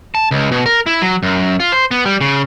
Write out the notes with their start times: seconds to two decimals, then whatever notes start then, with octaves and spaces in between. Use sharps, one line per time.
0.15 A5
0.31 C#2
0.52 B2
0.66 A#4
0.86 E4
1.02 F#3
1.23 F#2
1.60 F4
1.72 C5
1.91 B3
2.06 G3
2.21 C#3